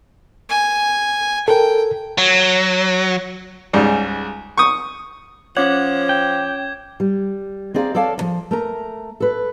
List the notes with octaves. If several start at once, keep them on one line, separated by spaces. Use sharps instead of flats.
G#5
A4 A#4 G5
F#3
C#2 G#2 G3
C#6 D#6
F3 C#4 C#5 F#5 D6 G#6
G5
G3
C4 G#4 D5 F5 A#5
A4 C#5 D5 F5 A5
E2 F3
A3 A#4 A#5
A4 B4